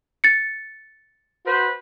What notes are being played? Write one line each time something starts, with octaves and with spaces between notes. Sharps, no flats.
A6 C#7
F#4 B4 C5